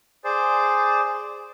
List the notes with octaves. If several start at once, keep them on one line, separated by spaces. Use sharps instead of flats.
G#4 C5 D5